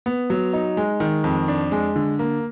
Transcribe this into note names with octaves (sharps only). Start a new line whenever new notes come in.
B3
F#3
D#4
G#3
D#3
F2
D4
G#3
D3
A#3